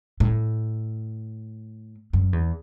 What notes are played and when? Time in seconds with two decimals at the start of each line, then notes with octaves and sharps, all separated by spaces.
0.20 A2
2.13 F#2
2.33 E2